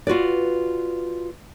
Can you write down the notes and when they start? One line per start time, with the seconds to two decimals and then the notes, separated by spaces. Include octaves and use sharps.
0.07 F4 F#4 B4 D5